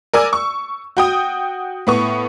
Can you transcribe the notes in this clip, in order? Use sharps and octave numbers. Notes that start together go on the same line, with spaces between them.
A#4 D5 G#5 E6
C#6
F#4 G5 D#6
A2 B3 C#6